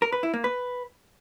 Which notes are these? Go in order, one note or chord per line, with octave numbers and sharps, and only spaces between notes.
A#4
B4
E4
A#3
B4